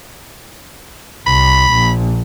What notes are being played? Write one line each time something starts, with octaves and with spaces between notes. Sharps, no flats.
C2 B5
A#1